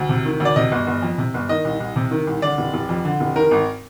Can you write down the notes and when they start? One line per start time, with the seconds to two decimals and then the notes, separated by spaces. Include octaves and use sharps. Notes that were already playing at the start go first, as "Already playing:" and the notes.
Already playing: D2
0.09 C3
0.25 D#3
0.40 D2
0.45 D5
0.56 C3 D#5
0.72 G1
0.87 G1
1.02 F2
1.18 C3
1.34 G1
1.49 D#3 D#5
1.65 C2
1.80 C2
1.96 C3
2.11 D#3
2.27 C2
2.42 D3 D5
2.58 F1
2.74 F1
2.89 F2
3.05 D3
3.20 F1
3.36 D#3 A#4
3.51 G#1